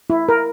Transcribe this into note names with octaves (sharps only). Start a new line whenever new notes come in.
E4
A#4